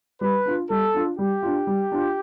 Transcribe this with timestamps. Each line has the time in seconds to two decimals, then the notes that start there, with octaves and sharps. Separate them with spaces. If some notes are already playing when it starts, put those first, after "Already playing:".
0.21 G3 B4
0.46 D4 F4
0.70 G3 A4
0.94 D4 F4
1.19 G3 G4
1.43 D4 F4
1.67 G3
1.92 D4 F4